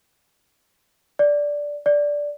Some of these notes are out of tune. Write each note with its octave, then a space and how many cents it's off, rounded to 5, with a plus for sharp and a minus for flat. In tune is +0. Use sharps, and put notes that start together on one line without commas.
D5 -5
D5 -5